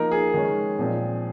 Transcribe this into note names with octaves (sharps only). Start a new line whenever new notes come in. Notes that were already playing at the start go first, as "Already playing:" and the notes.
Already playing: F3 A#3 D#4 A#4
G#4
D#3 G#3 C#4
A#2 F3 C4